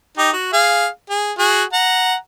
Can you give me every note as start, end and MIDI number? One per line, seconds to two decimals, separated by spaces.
0.18 0.31 63
0.18 0.31 67
0.33 0.51 66
0.53 0.87 68
0.53 0.87 77
1.10 1.32 68
1.39 1.64 66
1.39 1.64 68
1.73 2.15 78
1.73 2.15 82